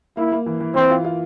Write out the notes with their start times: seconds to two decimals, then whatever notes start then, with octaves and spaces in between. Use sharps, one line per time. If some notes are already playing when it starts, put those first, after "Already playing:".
0.17 A#3 E4
0.32 A#3
0.46 E3
0.60 E3
0.75 E3 C4
0.90 F4
1.05 F4